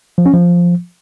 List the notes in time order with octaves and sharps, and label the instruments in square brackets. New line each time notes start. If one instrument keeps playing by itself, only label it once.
[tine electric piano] F3
C#4
F3